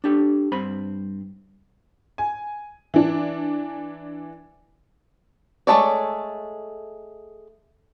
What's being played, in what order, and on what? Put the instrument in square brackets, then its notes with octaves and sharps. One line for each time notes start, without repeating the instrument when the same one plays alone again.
[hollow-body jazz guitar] D4 G4 A4
G2 C4 C5 B5
[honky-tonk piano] G#5
E3 D4
[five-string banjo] G#3 A3 A4 C#5 D5